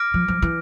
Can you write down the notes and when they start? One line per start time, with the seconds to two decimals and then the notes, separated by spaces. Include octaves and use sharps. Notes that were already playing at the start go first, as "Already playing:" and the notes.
Already playing: D6 F6 A#6 D7
0.14 F3
0.28 F3
0.42 E3